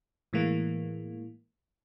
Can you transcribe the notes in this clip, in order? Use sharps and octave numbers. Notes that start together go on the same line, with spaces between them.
A2 E3 G#3 A#3